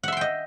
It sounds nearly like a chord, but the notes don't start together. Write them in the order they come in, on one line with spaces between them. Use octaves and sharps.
F#5 E5 C6 G5 D#5